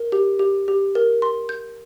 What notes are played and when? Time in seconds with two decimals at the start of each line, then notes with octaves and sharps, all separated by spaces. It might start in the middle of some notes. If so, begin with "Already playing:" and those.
Already playing: A#4
0.12 G4
0.39 G4
0.68 G4
0.95 A#4
1.22 C6
1.49 G6